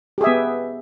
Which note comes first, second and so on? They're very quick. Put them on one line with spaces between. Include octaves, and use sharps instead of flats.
G4 G#4 E5 B3